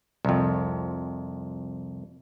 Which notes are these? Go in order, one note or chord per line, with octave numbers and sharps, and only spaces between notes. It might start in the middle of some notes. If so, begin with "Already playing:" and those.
C2 F2